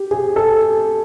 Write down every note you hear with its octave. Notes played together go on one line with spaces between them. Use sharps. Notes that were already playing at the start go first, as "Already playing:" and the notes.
Already playing: G4
G#4
A4